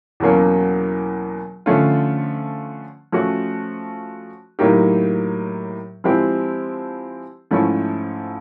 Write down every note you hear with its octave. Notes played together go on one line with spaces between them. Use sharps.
E2 B2 F#3 A#3 C#4
D3 F3 A3 C#4 F4
F3 A3 C#4 F#4
A2 F#3 A#3 D#4 G4
F3 G#3 C4 E4 G4
G#2 F3 A3 C#4 E4